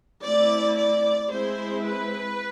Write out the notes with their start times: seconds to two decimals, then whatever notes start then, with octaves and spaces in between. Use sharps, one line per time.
0.23 A3 C4 E4 D5
0.76 D5
1.30 G#3 C4 E4 C5
1.83 B4